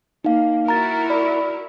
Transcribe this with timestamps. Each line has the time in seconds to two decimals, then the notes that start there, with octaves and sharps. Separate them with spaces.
0.24 A#3 D#4 F5
0.68 E4 F#4 A#4 A#5 A6
1.10 D5 B5